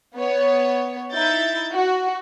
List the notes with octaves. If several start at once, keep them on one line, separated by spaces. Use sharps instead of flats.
B3 C#5
D#4 E4 G6 A6
F#4